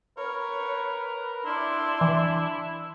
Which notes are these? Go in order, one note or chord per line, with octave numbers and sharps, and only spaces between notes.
A#4 B4 C#5
D4 E4 D5 C6
E3